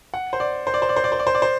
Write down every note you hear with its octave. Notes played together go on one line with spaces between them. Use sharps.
F#5
C5
D5
C5
D5
C5
D5
C5
D5
C5
D5
C5
D5
C5